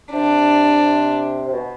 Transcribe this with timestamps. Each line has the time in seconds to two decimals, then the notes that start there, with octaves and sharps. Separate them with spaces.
0.13 C3 D4
0.83 C3
1.48 C3
1.53 B2